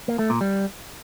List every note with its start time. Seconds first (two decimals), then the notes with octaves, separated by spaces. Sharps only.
0.08 A#3
0.19 A3
0.30 A#2
0.41 G3